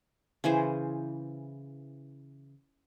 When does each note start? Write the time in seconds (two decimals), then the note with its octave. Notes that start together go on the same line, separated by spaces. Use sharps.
0.44 C#3 E3 G#4 C5